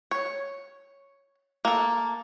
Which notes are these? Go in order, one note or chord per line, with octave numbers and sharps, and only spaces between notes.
C#5
A#3 A4